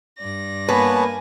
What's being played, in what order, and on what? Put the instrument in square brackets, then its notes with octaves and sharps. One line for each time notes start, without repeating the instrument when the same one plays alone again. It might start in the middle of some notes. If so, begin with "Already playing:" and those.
[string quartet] G2 D5 A#6
[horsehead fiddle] A#3 G#5 [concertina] B3 C#5 A5 [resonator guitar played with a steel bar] B4